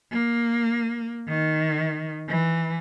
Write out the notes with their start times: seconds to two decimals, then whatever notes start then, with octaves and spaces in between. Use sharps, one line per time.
0.12 A#3
1.28 D#3
2.29 E3